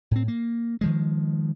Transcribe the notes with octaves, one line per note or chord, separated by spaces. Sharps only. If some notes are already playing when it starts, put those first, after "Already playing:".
A2 C4
A#3
D#3 F3 G#3